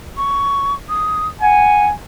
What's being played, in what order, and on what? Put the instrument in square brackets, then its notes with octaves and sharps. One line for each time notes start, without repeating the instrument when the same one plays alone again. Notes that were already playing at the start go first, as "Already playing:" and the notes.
[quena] C#6
D#6
[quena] F#5 [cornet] G#5